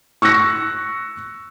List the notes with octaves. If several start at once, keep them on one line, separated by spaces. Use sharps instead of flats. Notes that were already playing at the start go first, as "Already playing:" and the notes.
C#6 E6 F#6 A#6 C#7